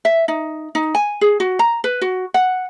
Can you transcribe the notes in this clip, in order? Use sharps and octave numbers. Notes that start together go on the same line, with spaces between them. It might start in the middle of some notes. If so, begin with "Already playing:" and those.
E5
D#4
D#4
G#5
G#4
F#4
A#5
B4
F#4
F#5